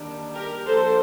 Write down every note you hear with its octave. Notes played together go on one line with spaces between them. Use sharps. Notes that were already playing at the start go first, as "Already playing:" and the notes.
Already playing: D#3 G3 A#3 D4
G4 A#4
F3 A#3 D4 A4 C5